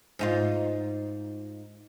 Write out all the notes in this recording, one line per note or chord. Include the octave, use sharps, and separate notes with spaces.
G#2 D#4 F4